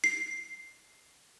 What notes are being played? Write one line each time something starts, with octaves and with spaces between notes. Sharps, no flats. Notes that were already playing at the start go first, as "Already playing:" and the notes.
C7